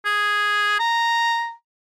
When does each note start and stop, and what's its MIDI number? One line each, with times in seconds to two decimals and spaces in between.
0.06 0.78 68
0.79 1.52 82